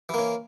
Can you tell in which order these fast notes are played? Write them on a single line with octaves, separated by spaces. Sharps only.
E3 A#3 C#4